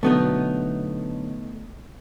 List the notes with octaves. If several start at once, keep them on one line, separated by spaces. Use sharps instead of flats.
B2 D3 F#3 A3 B3 D#4